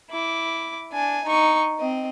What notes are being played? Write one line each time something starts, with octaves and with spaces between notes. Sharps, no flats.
E4 D6
D4 G#5
D#4 C#6
C4 D#5